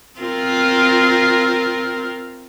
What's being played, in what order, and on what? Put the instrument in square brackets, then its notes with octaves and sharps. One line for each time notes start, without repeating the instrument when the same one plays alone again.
[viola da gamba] C4 F4 A#4